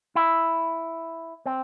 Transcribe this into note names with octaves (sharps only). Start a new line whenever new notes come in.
E4
C4